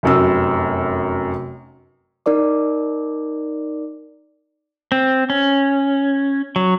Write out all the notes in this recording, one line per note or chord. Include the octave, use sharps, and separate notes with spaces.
F1 F#2 E6
D#4 A#4 D5 D6
C4
C#4
F#3